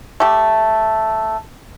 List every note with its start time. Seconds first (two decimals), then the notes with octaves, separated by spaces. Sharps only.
0.20 A3 G4